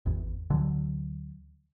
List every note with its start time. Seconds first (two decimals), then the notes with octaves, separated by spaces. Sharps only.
0.06 G#1 E2
0.50 D2 D3 E3 F#3